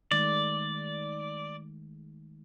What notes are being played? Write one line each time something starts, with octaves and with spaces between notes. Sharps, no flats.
D#3 G#3 A3 D5